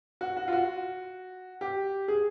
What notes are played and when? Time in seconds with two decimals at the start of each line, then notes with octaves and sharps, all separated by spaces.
0.21 F#4
0.37 F#4
0.48 F4
0.52 F#4
1.61 G4
2.08 G#4